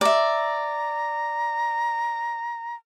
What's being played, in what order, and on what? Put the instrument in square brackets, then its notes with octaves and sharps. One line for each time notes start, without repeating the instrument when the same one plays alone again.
[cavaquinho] D5 E5 [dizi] A#5